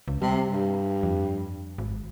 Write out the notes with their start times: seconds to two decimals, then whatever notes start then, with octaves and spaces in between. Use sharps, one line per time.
0.08 C#2
0.22 C3 G3
0.50 G2
1.03 F2
1.78 G#1